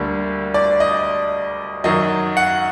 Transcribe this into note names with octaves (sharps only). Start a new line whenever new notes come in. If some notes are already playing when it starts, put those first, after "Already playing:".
Already playing: D2 D3 G3 A#3
D5
D#5
F#2 D#3 F#3 D#5
F#5